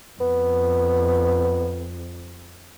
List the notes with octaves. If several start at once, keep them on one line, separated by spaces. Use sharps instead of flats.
F2 B3